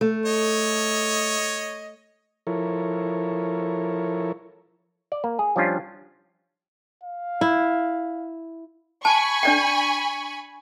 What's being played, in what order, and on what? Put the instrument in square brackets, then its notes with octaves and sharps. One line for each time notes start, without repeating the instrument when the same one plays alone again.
[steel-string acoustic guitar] A3
[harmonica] C#5 D#5
[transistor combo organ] F3 E4 A4 A#4 C#5
[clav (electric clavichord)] D5
A#3
G#4
F3 G3 C#4 D4 F4
[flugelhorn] F5
[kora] E4
[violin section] G#5 B5 C#6 [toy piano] A5
[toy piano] D4 D5 G5